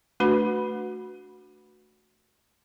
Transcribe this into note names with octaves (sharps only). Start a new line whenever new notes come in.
A3 D4 F#4 B4 B5